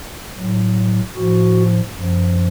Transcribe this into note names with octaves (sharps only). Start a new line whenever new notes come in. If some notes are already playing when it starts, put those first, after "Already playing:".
A2 F#3
A2 F3 F#4
F#2 F3